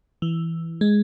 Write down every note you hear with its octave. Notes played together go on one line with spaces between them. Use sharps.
E3
G#3